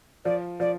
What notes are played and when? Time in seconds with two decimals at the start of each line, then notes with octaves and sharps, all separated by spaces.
0.25 F3 D5
0.60 F3 D5